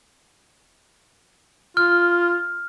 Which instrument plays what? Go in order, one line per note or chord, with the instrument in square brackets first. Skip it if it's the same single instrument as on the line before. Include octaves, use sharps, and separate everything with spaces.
[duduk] F4 [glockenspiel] F6